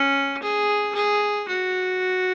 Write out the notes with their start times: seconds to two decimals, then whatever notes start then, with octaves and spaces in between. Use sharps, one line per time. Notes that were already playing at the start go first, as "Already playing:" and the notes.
Already playing: C#4
0.42 G#4
0.95 G#4
1.48 F#4